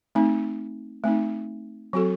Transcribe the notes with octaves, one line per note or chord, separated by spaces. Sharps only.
A3 C4 D#4
A3 C4 D#4
F#3 C4 F#4 A4